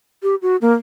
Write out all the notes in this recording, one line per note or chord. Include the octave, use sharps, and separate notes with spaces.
G4
F#4
A#3